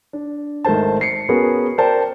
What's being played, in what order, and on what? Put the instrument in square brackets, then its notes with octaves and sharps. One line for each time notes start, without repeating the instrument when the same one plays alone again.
[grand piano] D4
G#1 A3 A#4 C5 A5
C7 C#7
B3 C#4 F#4 G#4 A#4 B4
A#4 C5 D5 G5 A5 A#5